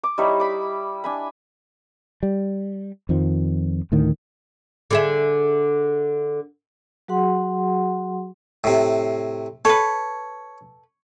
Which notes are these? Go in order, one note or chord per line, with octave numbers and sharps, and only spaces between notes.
D6
G3 D#4 E4 C#5
B5 D6
D4 G#5 B5
G3
F2 D#3 F3
D2 A2 D#3
D3 G#4 E5
F#3 F#4 G#4 F#5 C6
A2 C3
A4 B4 C#5